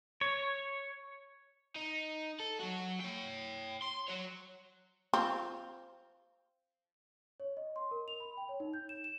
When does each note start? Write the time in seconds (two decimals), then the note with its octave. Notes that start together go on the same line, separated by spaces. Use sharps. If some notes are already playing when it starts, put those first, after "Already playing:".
0.21 C#5
1.76 D#4
2.40 A4
2.60 F#3 F#4
3.00 C#5 G5
3.82 C6
4.08 F#4 C#5
5.14 C4 F4
7.40 C#5
7.57 D#5
7.76 C6
7.91 A#4
8.08 F7
8.20 B5
8.37 G5
8.49 C#5
8.60 D#4
8.74 G6
8.89 E7
9.04 E7